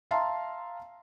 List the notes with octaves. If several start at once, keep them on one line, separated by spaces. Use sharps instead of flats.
E5 F5 A5 A#5 C6